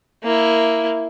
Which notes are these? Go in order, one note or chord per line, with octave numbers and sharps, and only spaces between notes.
A#3 E4